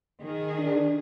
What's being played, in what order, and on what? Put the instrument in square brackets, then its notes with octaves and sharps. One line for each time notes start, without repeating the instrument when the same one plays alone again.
[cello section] D#3 G#4
[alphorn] D4